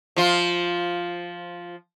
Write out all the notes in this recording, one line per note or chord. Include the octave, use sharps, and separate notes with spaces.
F3 F4